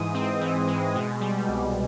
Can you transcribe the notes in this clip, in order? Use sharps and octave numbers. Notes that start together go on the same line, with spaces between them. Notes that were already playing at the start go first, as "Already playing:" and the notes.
Already playing: G#2 E3 G#3 D#6
C4
E3
G#3
B2
G3
C2